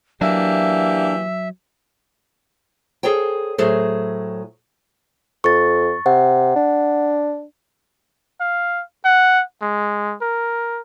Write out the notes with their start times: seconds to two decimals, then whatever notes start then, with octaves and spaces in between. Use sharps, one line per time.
0.21 E3 F#3 A#3 D4 G4 E5
3.03 G#4 A4 C5 C#5 G5
3.58 A2 F#3 G#4 A4 C5
5.44 F2 C#6 A6
6.06 C3 F#5
6.56 D4
8.40 F5
9.05 F#5
9.62 G#3
10.21 A#4